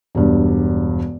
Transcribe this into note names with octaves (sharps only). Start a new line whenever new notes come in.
E1 G2